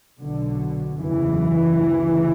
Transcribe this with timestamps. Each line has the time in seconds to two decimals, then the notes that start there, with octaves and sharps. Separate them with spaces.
0.20 B1 B2 D3
0.98 F#1 E2 C#3 E3
1.77 D2 C#3